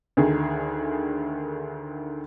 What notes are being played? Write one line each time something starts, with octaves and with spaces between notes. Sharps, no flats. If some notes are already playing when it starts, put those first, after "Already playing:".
D2 D3 D#3 G#4